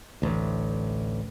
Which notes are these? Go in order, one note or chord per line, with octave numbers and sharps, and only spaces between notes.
A1 D2